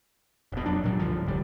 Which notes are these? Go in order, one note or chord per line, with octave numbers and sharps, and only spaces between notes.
E1 B2
F2 F#3 D4
A#2 F#3 G3
C2 G#2 D3 F3
D#1 G3